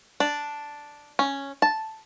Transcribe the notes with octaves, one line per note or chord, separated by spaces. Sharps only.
D4
C#4
A5